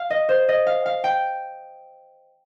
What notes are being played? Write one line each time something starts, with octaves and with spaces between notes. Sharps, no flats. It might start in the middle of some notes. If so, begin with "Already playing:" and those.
Already playing: F5
D#5
C5
D#5
F5
F5
G5